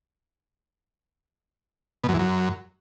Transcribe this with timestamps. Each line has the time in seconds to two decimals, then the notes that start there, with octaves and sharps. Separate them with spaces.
2.04 B2
2.09 F#2
2.14 E2
2.19 F#2